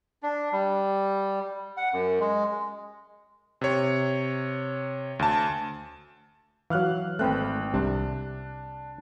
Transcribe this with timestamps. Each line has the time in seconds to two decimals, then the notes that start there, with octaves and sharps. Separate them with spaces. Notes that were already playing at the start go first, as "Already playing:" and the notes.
0.23 D4
0.52 G3
1.77 F#5
1.93 F#2
2.20 G#3
3.61 C3 C#5
5.19 D2 A5
6.70 E3 F#3 F5 F6 F#6
7.19 G#1 A3 C4 B4 G5 F#6
7.74 C2 C3 D4 A5